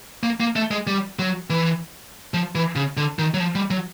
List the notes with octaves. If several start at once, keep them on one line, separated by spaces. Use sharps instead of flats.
A#3
A#3
A3
G#3
G3
F#3
E3
F3
E3
C#3
D3
D#3
F#3
F3
G3
F#3